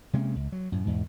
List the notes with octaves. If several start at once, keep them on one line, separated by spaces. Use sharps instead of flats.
C3 G#3 A#3 C#4
C#2
F#3
F#2 A2
E2 G#2 B2